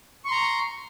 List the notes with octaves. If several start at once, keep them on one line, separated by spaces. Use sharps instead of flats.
A#5 C6 C#6